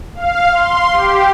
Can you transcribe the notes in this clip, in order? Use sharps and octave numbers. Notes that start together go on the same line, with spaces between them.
F5
C6
G4